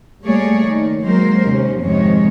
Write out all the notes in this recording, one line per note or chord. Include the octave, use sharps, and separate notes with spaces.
G3 A3 A#3 G#4 C#5 D5
D#3
F#3 G#3 A#3 A#4 C5
D#2 C3 C#4
F2 G#2 C3 D#3 G#3 C#5